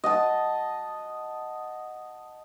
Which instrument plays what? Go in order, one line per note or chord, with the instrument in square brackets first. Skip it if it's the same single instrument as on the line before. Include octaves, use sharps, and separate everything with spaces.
[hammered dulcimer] D#5 F#5 A5